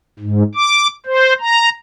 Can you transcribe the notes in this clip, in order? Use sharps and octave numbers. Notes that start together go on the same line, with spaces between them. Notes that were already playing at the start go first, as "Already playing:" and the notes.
G#2
D6
C5
A#5